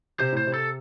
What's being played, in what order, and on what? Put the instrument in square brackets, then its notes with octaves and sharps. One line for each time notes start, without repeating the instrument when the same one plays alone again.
[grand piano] C3 [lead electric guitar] C5
[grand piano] A2 [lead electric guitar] C5
[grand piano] C3
[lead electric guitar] A4